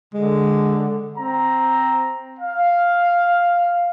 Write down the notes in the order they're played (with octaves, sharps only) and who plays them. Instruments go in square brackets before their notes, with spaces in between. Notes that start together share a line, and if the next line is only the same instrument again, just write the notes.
[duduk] D3 [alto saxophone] G#3
[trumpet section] C4 A#5
F5